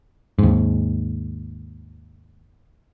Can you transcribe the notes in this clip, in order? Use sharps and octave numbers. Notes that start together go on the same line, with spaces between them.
D#2 G#2